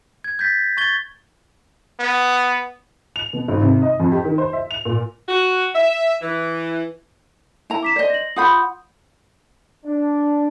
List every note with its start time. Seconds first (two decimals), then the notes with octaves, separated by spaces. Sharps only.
0.24 G#6
0.39 G6 A6 B6
0.77 C#6 G#6 A6 G7
2.00 B3
3.16 F7
3.33 B2
3.48 G#1
3.61 C3
3.82 D#5
4.00 F2
4.11 G4
4.25 D#3
4.38 C5
4.53 E5
4.71 F7
4.85 A#2
5.29 F#4
5.75 E5
6.22 E3
7.70 E4 A#5
7.83 D6 B6 E7
7.96 C5 D5 D#5
8.10 A#6 F#7
8.36 F4 F#5 B5 D#6 G6
9.84 D4